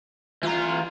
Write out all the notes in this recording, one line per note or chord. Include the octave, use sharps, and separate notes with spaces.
E3 F4 A#5